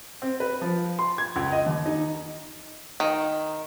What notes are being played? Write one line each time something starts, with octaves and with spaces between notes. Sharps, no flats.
C4
B4
F3
C6
G#6
C#2
D#5
D#2
D#4
D#3